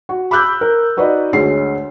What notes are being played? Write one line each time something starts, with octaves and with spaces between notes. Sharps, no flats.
F#4
B5 D6 E6 F#6 G6
A#4
D#4 F#4 B4 D5 D#5
D2 G#3 C#5 C7